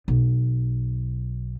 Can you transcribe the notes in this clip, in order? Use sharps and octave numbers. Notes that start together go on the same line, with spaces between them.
B1